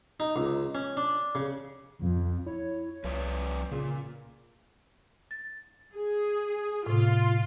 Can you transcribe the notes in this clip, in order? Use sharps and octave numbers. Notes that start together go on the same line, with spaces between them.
D#4
C#2
C#4
D4
C#3
F2
E4 C#5
C2 F3 B4 D5
A#2 C#3
A6
G#4
A2 C3 F4